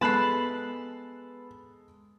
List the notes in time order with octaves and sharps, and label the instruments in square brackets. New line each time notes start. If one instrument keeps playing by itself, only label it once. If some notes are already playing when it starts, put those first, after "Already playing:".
[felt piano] G#3 A4 C7 [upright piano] B3 [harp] A5 B5 F#6